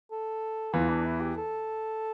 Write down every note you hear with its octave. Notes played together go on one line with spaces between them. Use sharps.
A4
E2 E3 F4
D4
E4
G4
A4